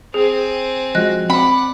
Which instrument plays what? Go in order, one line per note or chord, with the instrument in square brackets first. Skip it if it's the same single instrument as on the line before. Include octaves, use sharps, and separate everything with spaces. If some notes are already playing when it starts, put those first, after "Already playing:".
[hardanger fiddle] C4 G#5 [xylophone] G#4
[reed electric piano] F3 G#3 F#4 [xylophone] D#5 F#6
[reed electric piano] C4 [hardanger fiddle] D5 F#5 [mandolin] B5